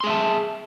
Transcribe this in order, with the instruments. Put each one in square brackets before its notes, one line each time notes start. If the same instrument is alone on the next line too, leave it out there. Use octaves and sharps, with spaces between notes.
[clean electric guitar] C6
G#4
E5
A5